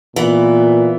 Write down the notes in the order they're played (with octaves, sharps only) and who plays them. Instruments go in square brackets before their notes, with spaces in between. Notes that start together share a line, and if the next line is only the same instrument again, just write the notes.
[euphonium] A#2 [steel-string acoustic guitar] E3 B3